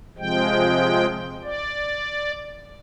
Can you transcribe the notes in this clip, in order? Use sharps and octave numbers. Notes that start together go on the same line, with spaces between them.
C3 F3 G#3 G5
D5